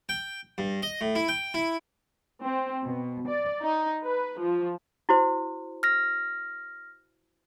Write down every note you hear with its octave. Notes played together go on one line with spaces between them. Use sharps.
G5
G2
D#5
A2
E4
G5
E4
C4
B2
D5
D#4
B4
F3
E4 F#4 C5
F6 A#6